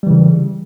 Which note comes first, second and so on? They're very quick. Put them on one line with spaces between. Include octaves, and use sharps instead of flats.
G3 E3 C#3